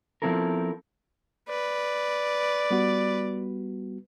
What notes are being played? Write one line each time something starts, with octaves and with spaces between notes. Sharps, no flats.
F3 B3 C4 E4 A4 A#4
B4 D5
G3 B3 F#4